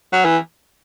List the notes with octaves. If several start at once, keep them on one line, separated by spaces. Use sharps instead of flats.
F#3
E3